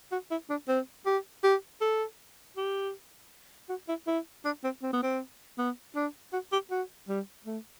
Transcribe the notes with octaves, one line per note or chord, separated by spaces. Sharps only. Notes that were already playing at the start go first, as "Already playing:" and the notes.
F#4
E4
D4
C4
G4
G4
A4
G4
F#4
E4
E4
D4
C4
C4
B3
C4
B3
D4
F#4
G4
F#4
G3
A3